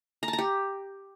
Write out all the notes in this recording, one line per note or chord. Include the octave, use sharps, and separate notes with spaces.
A#5
A5
A#5
G4